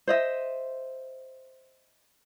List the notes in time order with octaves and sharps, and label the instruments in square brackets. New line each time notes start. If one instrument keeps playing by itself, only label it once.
[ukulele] C5 D#5 E5